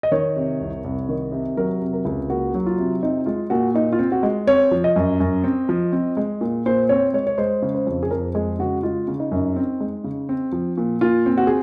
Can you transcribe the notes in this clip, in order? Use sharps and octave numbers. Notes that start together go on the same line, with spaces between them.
D#5
D#3 C#5
C3
C2
C2
D#3
C3
F#3 A#4
C3
A#4
C#2
A#3 F#4
F#3
F4
C3
C4 D#4
G#3 F4
A#2 F#4
A#2 D#4
F4
C4
F#4
G#3
C4 C#5
F3
D#5
F#2
F#2
C4
F3
C4
G#3
A#2
A#2 C5
C4 C#5
G#3 C#5
C#5
G#3 C5
C#3
C5
F2
G#4
F2 A#4
G#3 G#4
C#3 F#4
G#3 F4
C#3
D#4
F#2
C4
G#3
C#3
C4
F3
A#2
A#2 F4
C4
F#4
G#4